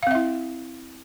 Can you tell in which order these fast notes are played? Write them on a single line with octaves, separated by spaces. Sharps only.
F5 C4 E5 E4